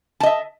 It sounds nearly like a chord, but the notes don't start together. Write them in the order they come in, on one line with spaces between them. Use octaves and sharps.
A5 D#5 E5